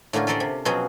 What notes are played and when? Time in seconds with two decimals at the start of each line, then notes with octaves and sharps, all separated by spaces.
0.13 A2 D3 A#3 C#4 F4
0.27 F4 G4 A4 A#4 C5 D5
0.40 C3
0.65 B2 F3 F#3 C4 C#4 G#4